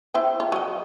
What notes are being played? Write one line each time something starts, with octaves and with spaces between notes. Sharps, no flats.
E4 C5 G5
F4
F#3 D#5